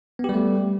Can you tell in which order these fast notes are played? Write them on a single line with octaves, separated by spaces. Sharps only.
B3 G4 G3 A3